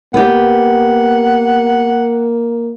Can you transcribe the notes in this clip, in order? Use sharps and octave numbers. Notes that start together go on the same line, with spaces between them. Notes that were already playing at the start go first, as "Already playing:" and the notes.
A#3 B3 G4 F#5